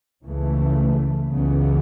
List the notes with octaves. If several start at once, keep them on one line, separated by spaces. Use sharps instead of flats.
C#2 C#3 E3 A3
C#2 C#3 E3 B3